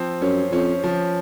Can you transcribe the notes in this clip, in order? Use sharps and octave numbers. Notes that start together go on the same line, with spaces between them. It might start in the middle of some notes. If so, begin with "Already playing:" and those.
Already playing: F3 C4
F#2 C#4
F2 C#4
F3